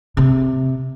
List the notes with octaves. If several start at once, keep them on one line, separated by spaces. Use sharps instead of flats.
C3